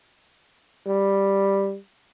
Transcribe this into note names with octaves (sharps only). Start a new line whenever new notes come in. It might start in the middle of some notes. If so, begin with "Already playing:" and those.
G3